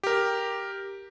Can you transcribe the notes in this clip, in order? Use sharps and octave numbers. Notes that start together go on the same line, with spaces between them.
G4 A#4